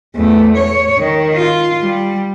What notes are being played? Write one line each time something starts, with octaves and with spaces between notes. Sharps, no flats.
E2 A3
C#5
D#3
F4
G3